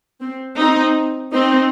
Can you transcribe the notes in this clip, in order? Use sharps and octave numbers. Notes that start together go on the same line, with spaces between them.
C4
C4 D#4
C4 D#4